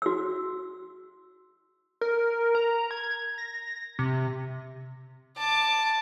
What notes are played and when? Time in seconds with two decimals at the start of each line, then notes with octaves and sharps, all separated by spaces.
0.02 F#4 E6
2.01 A#4
2.55 A#5
2.91 G#6
3.38 A#6
3.99 C3
5.38 A5 D6